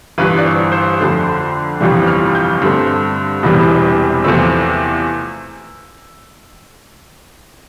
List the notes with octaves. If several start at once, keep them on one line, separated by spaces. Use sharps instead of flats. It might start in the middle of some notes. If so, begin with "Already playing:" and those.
G1 G2 E3 B4
D5
C5
C5
F2 D3 A3
G1 F2 C3 E3 G3
F6
G6
G2 D3 A3 C4
E1 E2 C3 E3 G3
E2 C3 F3 A3 C4 E6